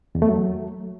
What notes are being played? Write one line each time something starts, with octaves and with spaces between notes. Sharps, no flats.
E2
A3
F#3